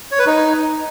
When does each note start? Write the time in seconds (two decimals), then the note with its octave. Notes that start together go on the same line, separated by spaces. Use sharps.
0.11 C#5
0.19 B4
0.26 D#4